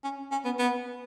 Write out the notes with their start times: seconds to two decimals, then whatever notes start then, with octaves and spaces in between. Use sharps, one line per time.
0.04 C#4
0.31 C#4
0.45 B3
0.59 B3